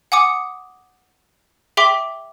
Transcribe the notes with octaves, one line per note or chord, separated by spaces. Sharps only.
F#5 G#5 D6 D#6 C#7
G#4 E5 G5 C6 D6 B6